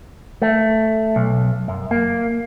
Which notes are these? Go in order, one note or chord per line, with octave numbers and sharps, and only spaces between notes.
A3
B1
F#2
A#3